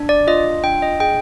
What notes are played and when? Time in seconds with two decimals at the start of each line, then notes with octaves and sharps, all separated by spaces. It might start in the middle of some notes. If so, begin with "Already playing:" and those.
Already playing: D4
0.09 D5
0.27 F4 D#5
0.64 D4 G5
0.82 D#5
1.00 G#4 G5